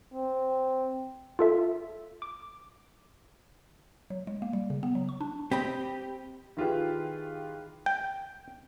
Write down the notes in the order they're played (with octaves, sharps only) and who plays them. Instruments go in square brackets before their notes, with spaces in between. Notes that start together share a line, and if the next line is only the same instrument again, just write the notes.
[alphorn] C4
[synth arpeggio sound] F4 A4 E5
D6
[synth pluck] F#3
G#3
A#3
G3
C#3
B3
F#3
C#6
D4
[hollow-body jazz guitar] C4 D#5 B5 [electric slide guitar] G4
[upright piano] D#3 E4 F4 G4 G#4 B4
[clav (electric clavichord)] G5